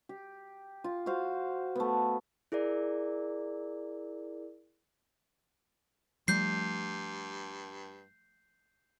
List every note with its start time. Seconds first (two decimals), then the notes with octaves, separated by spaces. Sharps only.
0.09 G4
0.84 F4
1.06 F#4 C5 F5
1.76 A3 B3
2.52 E4 G#4 A#4 D5
6.28 G2 F3 G3 A3 G6 C7